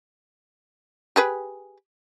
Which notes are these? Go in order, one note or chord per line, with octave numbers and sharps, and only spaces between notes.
G4 G#4 B4